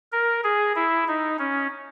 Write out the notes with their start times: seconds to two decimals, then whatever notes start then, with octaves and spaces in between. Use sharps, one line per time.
0.12 A#4
0.44 G#4
0.76 E4
1.08 D#4
1.39 C#4